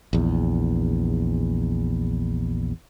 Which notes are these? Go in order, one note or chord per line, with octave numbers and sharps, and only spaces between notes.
A#1 E2